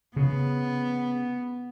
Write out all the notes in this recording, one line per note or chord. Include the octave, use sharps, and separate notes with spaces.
C#3 B3